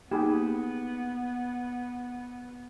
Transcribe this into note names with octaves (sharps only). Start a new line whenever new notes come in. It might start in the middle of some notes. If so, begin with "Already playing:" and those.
A#3 B3 D#4 G4 G#4